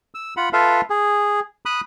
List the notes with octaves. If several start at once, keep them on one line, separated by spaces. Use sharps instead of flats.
E6
F4 F#5 B5
F4 A4 B4 E5 F5
G#4
B5 D#6 F#6